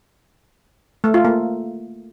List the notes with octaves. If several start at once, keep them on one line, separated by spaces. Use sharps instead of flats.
A3
F4
A#3